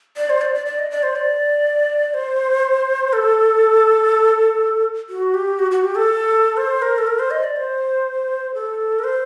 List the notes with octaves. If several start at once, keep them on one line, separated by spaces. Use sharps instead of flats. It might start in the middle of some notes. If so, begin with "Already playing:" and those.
D5
C5
D5
D5
D5
D#5
D5
C5
D5
C5
A4
F#4
G4
F#4
F#4
G4
A4
C5
A#4
A4
A#4
C5
D#5
D5
C5
A4
A#4
C5